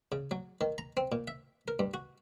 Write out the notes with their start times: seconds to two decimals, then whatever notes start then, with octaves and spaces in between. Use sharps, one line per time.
0.12 C#3
0.31 F#3
0.61 D#3
0.78 A#5
0.97 C4
1.12 A#2
1.28 E5
1.68 A#4
1.79 G2
1.94 F#4